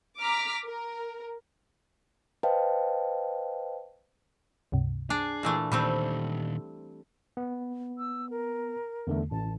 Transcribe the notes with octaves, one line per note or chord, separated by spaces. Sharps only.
A#5 D6 F6 B6
A#4
B4 C5 D#5 F5 G5 A5
C#2 G2 C3
D4 G#4
A#2 E3 A3
A#2 D#3 G3 A3 C4 B5
B3
E6
A#4
E2 D3 A3
A1 A5